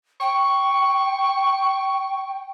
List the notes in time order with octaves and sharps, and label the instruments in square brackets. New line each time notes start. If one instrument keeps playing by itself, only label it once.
[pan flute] G5 [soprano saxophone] C#6